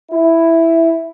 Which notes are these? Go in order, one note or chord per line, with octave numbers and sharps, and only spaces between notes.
E4